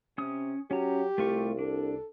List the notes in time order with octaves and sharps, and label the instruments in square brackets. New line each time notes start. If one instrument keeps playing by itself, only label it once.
[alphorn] C3 [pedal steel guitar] C#4 D#6
[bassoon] F#3 [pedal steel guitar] C#4 A#5 [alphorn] G4
[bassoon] C2 [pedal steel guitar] A3 F4 C#6
[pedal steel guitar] D4 [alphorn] A4